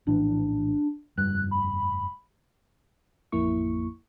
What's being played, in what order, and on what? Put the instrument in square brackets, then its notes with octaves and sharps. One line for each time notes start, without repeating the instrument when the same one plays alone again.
[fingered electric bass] A#1 A2 E3 [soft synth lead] D4
[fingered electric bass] F1 G2 G3 [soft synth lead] F#6
[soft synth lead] B5
[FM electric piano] A1 F2 A#3 E4 C#6